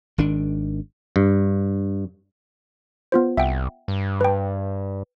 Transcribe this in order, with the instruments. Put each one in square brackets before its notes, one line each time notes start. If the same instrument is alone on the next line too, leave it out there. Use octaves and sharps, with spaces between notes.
[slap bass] G#1 D#3 D4
[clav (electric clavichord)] G2
[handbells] B3 F4 C5
[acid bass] C2 [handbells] E5 F#5 G5
[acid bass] G2
[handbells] B4 G5